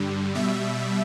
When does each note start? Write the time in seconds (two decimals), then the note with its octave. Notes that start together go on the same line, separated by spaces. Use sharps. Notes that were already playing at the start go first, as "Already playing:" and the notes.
Already playing: G2 D3 G3
0.35 B2 G3 E5